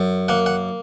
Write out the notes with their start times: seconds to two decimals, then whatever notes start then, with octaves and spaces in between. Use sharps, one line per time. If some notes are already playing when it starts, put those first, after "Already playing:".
Already playing: F#2
0.29 A#3 F#5
0.46 F#5